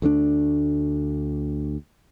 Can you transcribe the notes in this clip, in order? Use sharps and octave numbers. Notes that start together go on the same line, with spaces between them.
D2 A3 C4 D4